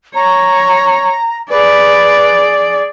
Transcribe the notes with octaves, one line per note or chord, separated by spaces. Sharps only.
C#5 A#5
G#4 B4 D5